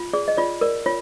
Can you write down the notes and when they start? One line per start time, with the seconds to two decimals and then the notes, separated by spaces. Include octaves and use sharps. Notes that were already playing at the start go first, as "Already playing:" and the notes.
Already playing: F4
0.13 G#4 D5
0.28 D#5
0.37 F4 D5
0.61 A#4 D5
0.86 F4 C#5